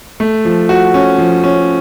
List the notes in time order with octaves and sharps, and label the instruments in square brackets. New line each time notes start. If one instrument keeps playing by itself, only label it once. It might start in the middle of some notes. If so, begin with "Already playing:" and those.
[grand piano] A3
F3
F#4
C#4
F3
C#4